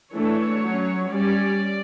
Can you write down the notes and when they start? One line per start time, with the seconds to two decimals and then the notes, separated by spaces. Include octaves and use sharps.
0.12 E3 A3 D4 C#5
0.61 F#3 C#4
1.10 G3 C#4 D5